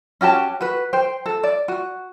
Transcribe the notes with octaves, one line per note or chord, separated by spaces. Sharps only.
C#4 F#4 G4 A5
F#4 B4
C5 G5
A4
D5
F#4